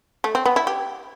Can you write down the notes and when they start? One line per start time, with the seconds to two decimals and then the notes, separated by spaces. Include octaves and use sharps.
0.24 A3
0.35 C4
0.46 B3
0.56 E4
0.67 G4